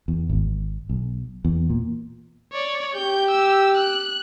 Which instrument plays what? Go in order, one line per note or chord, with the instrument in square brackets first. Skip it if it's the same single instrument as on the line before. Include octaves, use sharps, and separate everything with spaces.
[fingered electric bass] E2
G#1
B1
E2
A#2
[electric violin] C#5 D5
[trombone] G4 [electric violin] G6
[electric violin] E6
F#6